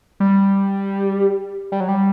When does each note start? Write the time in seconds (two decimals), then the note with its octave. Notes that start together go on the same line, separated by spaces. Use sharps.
0.20 G3
1.72 G3
1.80 F#3
1.89 G3